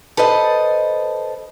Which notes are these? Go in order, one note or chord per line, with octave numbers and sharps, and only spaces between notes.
A4 B4 C5 D#5 A5